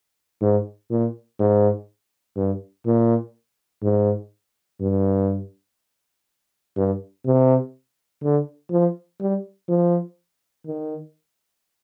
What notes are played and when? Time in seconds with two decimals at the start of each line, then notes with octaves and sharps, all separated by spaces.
0.42 G#2
0.91 A#2
1.40 G#2
2.36 G2
2.86 A#2
3.83 G#2
4.81 G2
6.77 G2
7.26 C3
8.23 D3
8.71 F3
9.21 G3
9.69 F3
10.67 D#3